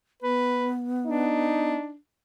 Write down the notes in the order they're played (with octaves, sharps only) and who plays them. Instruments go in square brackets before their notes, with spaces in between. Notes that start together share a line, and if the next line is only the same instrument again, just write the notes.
[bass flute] B3 [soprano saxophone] B4
[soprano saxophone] D4 [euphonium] D#4